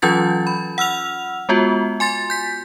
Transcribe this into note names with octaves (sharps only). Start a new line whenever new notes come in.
E3 F#3 C#4 F4 G6 A6
B5
F#5 E6 F6 F7
G#3 B3 F4 F#4
G#5 C6 A6
G6 B6